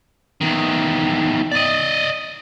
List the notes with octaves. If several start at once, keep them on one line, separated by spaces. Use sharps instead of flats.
E2 D#3
D5 D#5